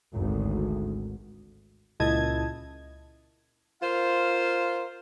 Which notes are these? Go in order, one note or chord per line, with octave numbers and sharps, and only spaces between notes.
G#1 D2
C#2 A#2 E4 D#5 A5 G#6
F4 A#4 C5 F5